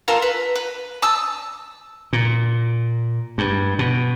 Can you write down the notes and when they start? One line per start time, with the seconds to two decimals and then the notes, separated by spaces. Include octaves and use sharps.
0.08 F4 A4 A#4
0.22 B4
0.56 B4
1.02 A5 D#6 E6
2.13 A#2
3.38 G2
3.79 B2